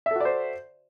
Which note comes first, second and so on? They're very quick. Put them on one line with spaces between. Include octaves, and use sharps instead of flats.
E5 A4 F#4 D5 C5